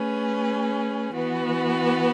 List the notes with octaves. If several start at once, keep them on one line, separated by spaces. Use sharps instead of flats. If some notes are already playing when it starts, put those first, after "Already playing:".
Already playing: A3 C#4 G#4 B4
E3 B3 F#4 B4